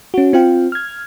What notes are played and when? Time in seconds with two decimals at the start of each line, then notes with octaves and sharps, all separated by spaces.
0.14 C#4 F#4
0.33 C4 F4 F5 G5
0.72 F6 G#6